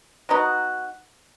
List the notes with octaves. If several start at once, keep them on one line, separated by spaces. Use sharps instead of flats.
F#3 B3 D#4 F#4